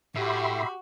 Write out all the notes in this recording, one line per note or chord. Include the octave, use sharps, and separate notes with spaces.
A2 F#4 G4 E5 B5 C6